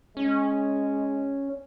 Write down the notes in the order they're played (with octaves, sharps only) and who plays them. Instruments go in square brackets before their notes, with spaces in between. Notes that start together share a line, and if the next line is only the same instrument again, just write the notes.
[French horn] G#3 [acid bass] C#4